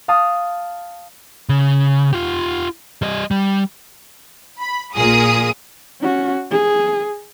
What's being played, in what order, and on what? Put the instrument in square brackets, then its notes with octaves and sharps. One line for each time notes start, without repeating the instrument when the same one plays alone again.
[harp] F5 A5 D#6
[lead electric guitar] C#3
F4 G4
G3 D#5
G3
[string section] B5
A#1 A#2 G#4 A#4 D#6
[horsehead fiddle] C#4 F#4
G#4